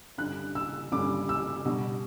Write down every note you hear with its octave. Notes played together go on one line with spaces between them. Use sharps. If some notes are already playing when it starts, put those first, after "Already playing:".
G2 D3 G3 C#4 F#6
E6
G2 D3 G3 C#4 D6
E6
B2 G3 D4